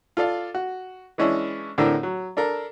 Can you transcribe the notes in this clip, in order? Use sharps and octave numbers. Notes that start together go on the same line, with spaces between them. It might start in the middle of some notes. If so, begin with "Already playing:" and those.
F4 A4 D5 F5
F#4
E3 G#3 C#4 D4 E4
A2 D3 C4 D4 E4 A#4
F#3
D4 A4 A#4